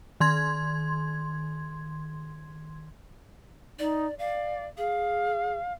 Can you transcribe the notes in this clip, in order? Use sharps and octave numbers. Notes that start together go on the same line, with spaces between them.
D#3 C6 G#6
D#4 D5
D5 F5
G#4 F5